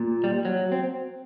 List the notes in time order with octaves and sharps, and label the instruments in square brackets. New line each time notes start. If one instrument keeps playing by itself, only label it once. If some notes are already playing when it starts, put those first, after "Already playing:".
Already playing: [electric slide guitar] A#2
G3
F#3
C4